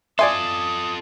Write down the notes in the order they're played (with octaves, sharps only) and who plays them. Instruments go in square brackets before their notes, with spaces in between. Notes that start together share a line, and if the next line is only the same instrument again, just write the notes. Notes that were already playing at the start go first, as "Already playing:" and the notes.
[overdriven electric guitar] F4 A4 [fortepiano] D5 G#5 C6 [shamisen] E5 [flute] D#6